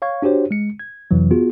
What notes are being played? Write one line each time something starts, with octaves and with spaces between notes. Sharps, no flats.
C#5 F5 C#6 G#6
D4 F#4 G4 C5 C#5
G#3 C#7
G#6
F2 C3 E3 F#3
B3 F4 F#4 G#4